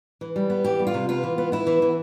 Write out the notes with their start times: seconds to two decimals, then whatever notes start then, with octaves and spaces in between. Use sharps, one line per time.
0.21 E3
0.36 G3
0.50 B3
0.64 E3 G4
0.79 G3
0.87 F4
0.94 C3
1.09 B3 F4
1.23 E3
1.38 B3
1.52 B3 E4
1.67 E3
1.82 E3